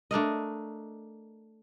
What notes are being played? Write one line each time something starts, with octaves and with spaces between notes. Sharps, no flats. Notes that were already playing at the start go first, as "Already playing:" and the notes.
A3 D4 A#4 D#5